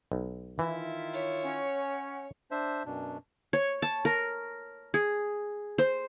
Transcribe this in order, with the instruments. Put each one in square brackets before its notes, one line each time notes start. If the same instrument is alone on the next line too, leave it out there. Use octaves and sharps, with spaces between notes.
[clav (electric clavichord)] B1
[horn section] D#3 E4 F4 [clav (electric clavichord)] E3 [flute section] E5
[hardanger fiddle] C#5
[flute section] C#4 F#5 G#5
[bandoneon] D4 C5 E5
F#2 B2 D4
[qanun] C#5
A5
A#4
G#4
C5